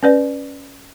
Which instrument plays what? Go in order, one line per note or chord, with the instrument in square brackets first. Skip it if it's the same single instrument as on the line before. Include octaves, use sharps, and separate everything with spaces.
[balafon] C#4 B4 D5